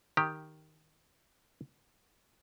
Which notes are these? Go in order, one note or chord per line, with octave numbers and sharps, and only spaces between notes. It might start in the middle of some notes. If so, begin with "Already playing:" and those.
D#3 G4